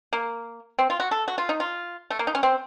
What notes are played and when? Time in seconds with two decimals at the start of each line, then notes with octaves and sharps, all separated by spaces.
0.13 A#3
0.79 C4
0.90 F4
1.00 F#4
1.11 A4
1.28 F#4
1.38 F4
1.49 D#4
1.60 F4
2.10 A3
2.19 A#3
2.27 D#4
2.35 C#4
2.43 C4